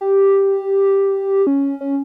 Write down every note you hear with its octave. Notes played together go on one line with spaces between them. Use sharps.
G4
C#4
C#4